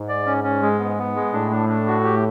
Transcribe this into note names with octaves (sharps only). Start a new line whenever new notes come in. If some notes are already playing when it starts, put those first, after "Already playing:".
Already playing: G#2
D5
C#4
C#4
G#3
B3
B3
G#3
A2 D4
D4
D4
F#4
G4